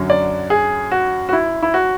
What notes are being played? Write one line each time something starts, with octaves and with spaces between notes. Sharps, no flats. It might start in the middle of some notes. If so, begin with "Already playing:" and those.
Already playing: F#2 D3 F#3
D5
G#4
F#4
F#4
E4
E4
F#4